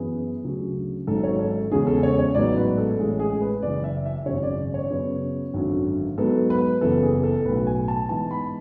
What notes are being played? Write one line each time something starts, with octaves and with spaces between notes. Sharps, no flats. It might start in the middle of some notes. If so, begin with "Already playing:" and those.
Already playing: F#2 E3 B3 G#4
D2 C#3 F#3
G#1 G#2 F#3 C#4 A4
C#5
A4
E2 C#3 G#3 C#4 G#4
A4
C#5
C#5
A1 G#2 F#3 B3 D5
B4
A4
A1 A2 G#3 C#4
G#4
B4
F#1 F#2 E3 D5
E5
E5
G#1 F#2 C#3 C#5
D5
C#5
F#2 C#3 F#3 B3
G#1 F#2 D3 F#3
G#2 F#3 B3 A4
B4
F#1 F#2 E3 B3 A4
G#4
A4
B1 A2 F#3 B4
G#5
A5
G#2 E3 B3 A5
B5